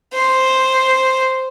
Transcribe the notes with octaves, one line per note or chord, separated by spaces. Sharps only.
C5